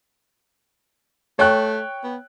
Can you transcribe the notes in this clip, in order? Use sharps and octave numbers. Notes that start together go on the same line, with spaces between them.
A3 C#5 G5 F#6
B3